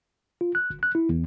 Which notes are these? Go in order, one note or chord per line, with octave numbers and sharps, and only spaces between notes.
F4
F#6
G1
F#6
E4
E2